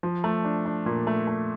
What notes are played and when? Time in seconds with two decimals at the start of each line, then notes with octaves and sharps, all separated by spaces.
0.03 F3
0.24 A3
0.45 D4
0.66 D4
0.86 A#2
1.07 A3
1.27 A3